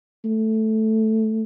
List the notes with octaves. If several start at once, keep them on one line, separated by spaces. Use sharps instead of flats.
A3